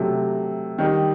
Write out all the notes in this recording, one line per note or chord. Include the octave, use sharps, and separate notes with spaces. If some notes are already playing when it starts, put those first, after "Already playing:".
Already playing: C3 F#3 A3
D#3 G3 D#4